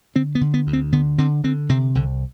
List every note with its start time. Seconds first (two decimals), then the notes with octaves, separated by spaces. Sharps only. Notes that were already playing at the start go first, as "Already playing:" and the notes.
0.15 D3 C4
0.35 B3
0.41 D3
0.54 B3
0.67 D2
0.73 C4
0.93 D3 B3
1.18 D3 C4
1.44 D3 C4
1.69 C3 C4
1.95 C2 D3